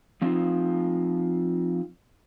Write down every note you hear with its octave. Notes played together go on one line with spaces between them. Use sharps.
F3 C4 D#4 F4